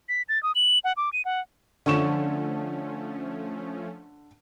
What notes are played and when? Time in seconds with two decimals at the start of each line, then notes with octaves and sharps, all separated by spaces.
0.09 B6
0.29 A6
0.43 D#6
0.55 F#7
0.84 F#5
0.97 D6
1.13 D#7
1.25 F#5
1.86 D3 F3 A3 C#4 C#6 E7